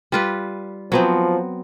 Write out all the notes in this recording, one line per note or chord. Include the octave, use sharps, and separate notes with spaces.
G3 F4 B4
F3 F#3 B3 C4